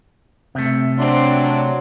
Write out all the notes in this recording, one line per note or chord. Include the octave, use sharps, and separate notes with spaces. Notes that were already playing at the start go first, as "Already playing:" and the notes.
C3 A3
F#3 C4 D4 C6